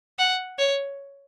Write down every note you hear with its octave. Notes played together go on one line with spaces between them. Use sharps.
F#5
C#5